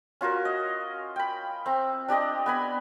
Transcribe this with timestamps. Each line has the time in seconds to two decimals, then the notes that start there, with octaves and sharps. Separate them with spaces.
0.21 C#4 F4 F#4 A#4
0.45 D#5
1.16 G5 B5
1.66 C4 A#5
2.08 D4 G4 D5 D#5
2.46 B3 G#5 B5